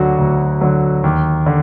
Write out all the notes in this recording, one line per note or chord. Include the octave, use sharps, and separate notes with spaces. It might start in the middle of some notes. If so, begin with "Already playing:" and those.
Already playing: D2 D3 F#3 F#4
D2
D3 F#3
D#2
D3